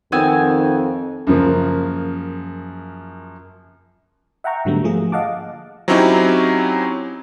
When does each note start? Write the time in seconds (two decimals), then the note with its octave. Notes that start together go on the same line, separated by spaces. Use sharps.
0.12 F2 D#3 B3 C4 G#5
1.27 F#2 C#3 F3 A#3
4.44 E5 F#5 G5 A#5 C#6
4.65 G#2 D3 F#3 G3 A3 B3
4.84 F3 A3 A#3 G#4
5.12 D#5 F5 F#5 A5 D6
5.88 F#3 C4 C#4 D#4 E4 G4